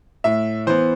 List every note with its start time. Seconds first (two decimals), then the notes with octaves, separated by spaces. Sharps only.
0.24 A2 E5
0.67 E3 B3 C5